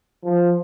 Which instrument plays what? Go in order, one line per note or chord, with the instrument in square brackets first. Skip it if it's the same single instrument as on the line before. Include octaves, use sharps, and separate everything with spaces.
[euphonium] F3